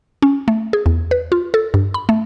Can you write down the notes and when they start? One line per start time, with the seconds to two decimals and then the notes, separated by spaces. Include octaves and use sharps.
0.22 C#4
0.48 A3
0.73 G#4
0.86 E2
1.11 B4
1.32 F4
1.54 A4
1.74 G2
1.94 B5
2.09 A3